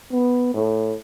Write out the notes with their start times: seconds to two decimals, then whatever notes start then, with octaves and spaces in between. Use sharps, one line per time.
0.11 B3
0.54 A2